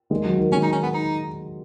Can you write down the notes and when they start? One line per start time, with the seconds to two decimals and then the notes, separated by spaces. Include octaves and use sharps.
0.10 D#3 G#3
0.25 F#3
0.38 D#3
0.52 D#3 G#3 C#4
0.63 D#4
0.73 C#4
0.83 B3
0.94 D#4